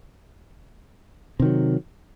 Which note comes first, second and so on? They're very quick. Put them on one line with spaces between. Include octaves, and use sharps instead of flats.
C3 D#3 F#3